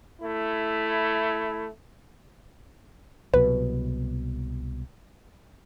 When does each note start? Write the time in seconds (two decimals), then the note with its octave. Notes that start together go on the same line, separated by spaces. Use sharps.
0.21 A3 E4
3.34 C2 B2 F#3 B4